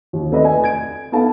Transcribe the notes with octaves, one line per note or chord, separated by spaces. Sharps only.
D#2
A3 C4 A4 B4 D5 D#5
G#5
G#6 D7
B3 D#4 A4 F5 A5